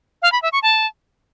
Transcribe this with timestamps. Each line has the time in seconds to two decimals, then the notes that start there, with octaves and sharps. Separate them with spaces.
0.22 F5
0.32 B5
0.42 E5
0.52 C#6
0.63 A5